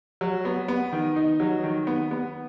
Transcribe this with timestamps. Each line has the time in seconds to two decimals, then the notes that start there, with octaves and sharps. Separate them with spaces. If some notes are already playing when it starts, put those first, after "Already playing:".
0.21 F#3
0.45 B3
0.68 B3
0.92 D#3
1.16 D#4
1.40 F#3
1.64 D#3
1.87 B3
2.11 B3